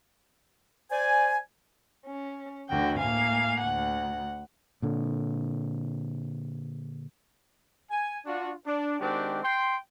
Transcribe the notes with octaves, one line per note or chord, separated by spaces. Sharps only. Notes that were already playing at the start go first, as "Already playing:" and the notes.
C5 D5 G#5
C#4
D2 D3 E3 F#4 G5
A2 A#3 F5 G#5
D2 F#5
A#2 D3
G#5
D4 F4 F#4
D4
D#3 G#3 C4 D4 F#4 G4
G5 C6